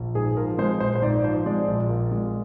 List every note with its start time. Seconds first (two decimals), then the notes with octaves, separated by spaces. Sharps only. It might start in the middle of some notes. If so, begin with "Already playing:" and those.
Already playing: A#1
0.15 G#2 G#4
0.37 F3 A#4
0.58 G#3 C5
0.80 A#1 C5
0.95 C5
1.02 G#2 D5
1.24 F3 C5
1.46 G#3 D5
1.68 A#1
1.89 A#2
2.11 G#3